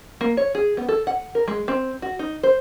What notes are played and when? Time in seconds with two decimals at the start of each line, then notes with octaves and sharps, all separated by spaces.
0.21 A#3
0.37 C#5
0.55 G#4
0.77 B3
0.89 A4
1.07 F#5
1.35 A#4
1.48 G#3
1.68 C4
2.02 F#4
2.19 D#4
2.43 C5